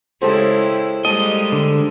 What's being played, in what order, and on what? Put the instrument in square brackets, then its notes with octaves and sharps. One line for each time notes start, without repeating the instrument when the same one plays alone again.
[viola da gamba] C#3 G#3 E4 [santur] G4 A4 C5
[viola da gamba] G3 G#3 A#3 [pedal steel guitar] D#5 [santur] A5
[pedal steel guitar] D3